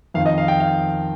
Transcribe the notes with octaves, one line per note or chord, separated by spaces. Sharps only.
F2 D#3 F5
D#5
F5
G5
F5